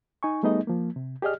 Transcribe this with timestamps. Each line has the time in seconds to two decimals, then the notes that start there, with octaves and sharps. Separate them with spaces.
0.23 D#4 G#5 C#6
0.43 G3 A3 B3 D#4 G#4 D#5
0.67 F3 A#3
0.96 C3
1.22 G4 G#4 D5 D#5 F6